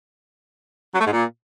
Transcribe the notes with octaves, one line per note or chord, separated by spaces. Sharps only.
F#3
A3
G#2
A#2